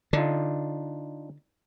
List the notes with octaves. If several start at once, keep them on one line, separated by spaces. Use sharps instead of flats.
D3 D4 D#4 F4